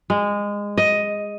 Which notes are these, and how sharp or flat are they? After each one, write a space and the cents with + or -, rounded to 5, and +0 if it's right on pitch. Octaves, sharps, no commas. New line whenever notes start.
G#3 -20
D#5 +5